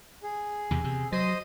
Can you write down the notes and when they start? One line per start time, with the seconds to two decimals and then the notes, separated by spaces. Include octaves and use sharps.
0.23 G#4
0.71 E2 C3
0.84 C3
1.12 F#3 C5 D#5 D#6